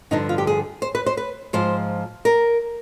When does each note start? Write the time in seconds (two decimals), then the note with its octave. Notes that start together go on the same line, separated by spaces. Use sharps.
0.11 G2 D3 F3 D#4
0.29 F4
0.38 G4
0.47 G#4
0.82 C5
0.95 B4
1.06 C5
1.17 B4
1.53 G#2 F3 C5
2.25 A#4